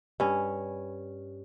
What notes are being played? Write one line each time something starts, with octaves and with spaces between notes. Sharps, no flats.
G2 C#4